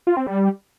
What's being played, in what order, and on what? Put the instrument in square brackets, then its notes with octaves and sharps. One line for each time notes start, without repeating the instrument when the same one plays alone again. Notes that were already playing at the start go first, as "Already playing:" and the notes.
[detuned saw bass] F4
C4
G3